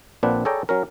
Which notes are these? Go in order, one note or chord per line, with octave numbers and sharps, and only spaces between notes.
A#1 A#2 C4 D4 B4 F#5
G#4 A4 C#5 D5 G5 A#5
F#3 C#4 A#4